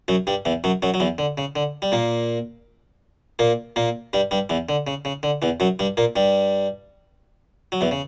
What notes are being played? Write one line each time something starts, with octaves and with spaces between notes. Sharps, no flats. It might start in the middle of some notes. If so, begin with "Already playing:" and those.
F#2 F#3
G2 G3
E2 E3
F#2 F#3
F#2 F#3
F#3
E2 E3
D3
C#3
D3
G3
A#2 A#3
A#2 A#3
A#2 A#3
G2 G3
G2 G3
E2 E3
D3
C#3
C#3
D3
E2 E3
F#2 F#3
G2 G3
A#2 A#3
G2 G3
F#3
E2 E3
C#3